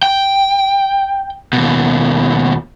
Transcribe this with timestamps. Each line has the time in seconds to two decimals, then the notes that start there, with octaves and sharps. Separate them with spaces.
0.03 G5
1.53 D#2 B2